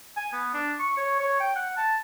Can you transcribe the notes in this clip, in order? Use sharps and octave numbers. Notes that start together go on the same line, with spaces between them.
G#5
B3
D4
C#6
C#5
C#5
G5
F#5
A5